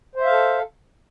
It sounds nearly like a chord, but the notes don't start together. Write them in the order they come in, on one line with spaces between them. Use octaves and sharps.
C5 E5 F5 A4